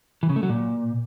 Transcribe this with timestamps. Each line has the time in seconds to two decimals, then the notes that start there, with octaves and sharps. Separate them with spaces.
0.23 E3
0.29 C#3
0.36 A3
0.43 F#3
0.50 A#2